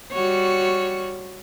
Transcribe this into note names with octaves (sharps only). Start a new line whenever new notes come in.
G3 F#4 C#5